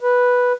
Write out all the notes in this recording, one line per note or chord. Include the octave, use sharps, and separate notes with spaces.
B4